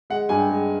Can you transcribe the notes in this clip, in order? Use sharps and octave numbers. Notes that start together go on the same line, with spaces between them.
G#3 F#5
G2 G#5
G5
G#3